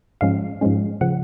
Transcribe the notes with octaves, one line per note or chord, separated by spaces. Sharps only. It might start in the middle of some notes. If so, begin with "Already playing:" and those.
G#2 F3 G#3 C#4 F5
G#2 F3 G#3 C#4
C#3 F3 F#5